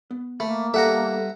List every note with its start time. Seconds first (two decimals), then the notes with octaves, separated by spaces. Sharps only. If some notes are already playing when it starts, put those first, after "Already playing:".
0.11 B3
0.40 A3 A#3 B5
0.74 G3 B3 G4 A4 E5 F#5 A#5